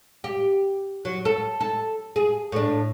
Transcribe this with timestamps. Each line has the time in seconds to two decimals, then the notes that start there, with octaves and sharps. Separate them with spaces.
0.24 G4
1.05 F#3
1.25 A4
1.60 A4
2.16 G#4
2.52 A2 D4